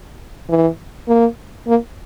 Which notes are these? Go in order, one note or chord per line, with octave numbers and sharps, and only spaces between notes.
E3
A#3
A#3